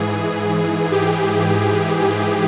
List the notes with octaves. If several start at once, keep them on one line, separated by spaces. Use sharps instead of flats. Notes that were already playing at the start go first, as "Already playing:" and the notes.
Already playing: G#2 E3 G#4
G4